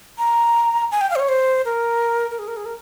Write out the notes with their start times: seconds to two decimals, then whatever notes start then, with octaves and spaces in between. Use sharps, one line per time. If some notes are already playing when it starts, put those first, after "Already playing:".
0.18 A#5
0.91 G#5
1.01 G5
1.11 F5
1.16 C5
1.19 C#5
1.29 C5
1.65 A#4
2.31 A#4
2.39 G#4
2.48 A#4
2.57 G#4
2.65 A#4